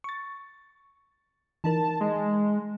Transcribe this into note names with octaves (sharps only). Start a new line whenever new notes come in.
C#6 A6
E3 D#4 A#4 A5
G#3